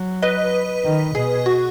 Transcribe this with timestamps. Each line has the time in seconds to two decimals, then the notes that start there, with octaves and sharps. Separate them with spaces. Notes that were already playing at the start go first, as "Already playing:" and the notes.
Already playing: F#3
0.22 B4 D#5
0.84 D#3
1.15 B2 G#4
1.46 F#4